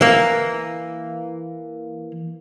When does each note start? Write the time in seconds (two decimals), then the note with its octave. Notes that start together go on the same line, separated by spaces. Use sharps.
0.01 E3 A#3